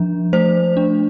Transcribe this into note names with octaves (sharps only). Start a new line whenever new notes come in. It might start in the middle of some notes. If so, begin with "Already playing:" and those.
Already playing: F3 D4
A3 C5
D4